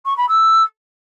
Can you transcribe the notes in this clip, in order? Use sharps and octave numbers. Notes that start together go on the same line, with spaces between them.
C#6
B5
E6